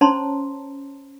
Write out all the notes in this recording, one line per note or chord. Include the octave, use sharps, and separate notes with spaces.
C#4 C5 C#5 A5 A#5 C6